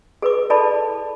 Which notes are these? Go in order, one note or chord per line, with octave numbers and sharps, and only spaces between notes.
G#4 B4 D6
E4 A4 D5 A5 B5